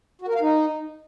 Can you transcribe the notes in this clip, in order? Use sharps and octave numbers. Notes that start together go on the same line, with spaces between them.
F#4
A#4
F5
D#4